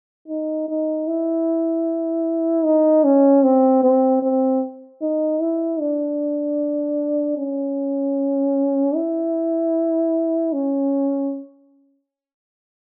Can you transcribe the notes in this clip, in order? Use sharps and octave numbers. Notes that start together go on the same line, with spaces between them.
D#4
D#4
E4
D#4
C#4
C4
C4
C4
D#4
E4
D4
C#4
E4
C#4